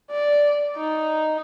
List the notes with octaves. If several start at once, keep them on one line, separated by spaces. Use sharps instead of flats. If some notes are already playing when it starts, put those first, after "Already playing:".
D5
D#4